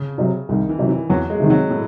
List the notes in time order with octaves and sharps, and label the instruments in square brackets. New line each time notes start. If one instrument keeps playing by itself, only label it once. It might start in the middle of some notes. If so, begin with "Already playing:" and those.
Already playing: [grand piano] C#3
[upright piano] C3 F#3
[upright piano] C2 [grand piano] D#3
[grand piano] E3
[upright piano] C3 F#3
[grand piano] E3
[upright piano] E2 [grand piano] F#3
[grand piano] G#3
[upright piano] C3 D#3
[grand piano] F#3
A2